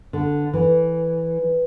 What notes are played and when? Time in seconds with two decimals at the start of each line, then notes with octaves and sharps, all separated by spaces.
0.13 D3
0.53 E3